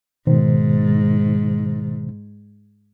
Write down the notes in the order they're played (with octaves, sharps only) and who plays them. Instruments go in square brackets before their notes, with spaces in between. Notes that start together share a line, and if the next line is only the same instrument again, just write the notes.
[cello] G#2 [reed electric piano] B2 D#3 C5